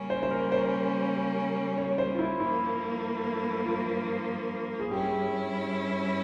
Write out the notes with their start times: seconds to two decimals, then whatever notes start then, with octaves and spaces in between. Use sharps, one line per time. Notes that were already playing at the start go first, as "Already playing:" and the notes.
Already playing: C#3 G3 A#3 C#4
0.10 C5
0.23 C5
0.31 A#4
0.52 C5
1.78 C#5
1.98 C5
2.14 F4
2.19 E4
2.40 G2 F3 A#3 E4
3.65 F4
4.80 G#4
4.91 G2 G3 C#4 E4 G4